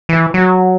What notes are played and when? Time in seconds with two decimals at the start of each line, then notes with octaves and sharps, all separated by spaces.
0.09 E3
0.34 F#3